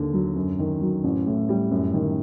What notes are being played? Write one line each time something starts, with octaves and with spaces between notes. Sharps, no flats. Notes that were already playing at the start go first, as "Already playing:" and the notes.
Already playing: D#2 D3
F#3
F#2
D#3
F#3
A1
A2
G3
F#2
D#3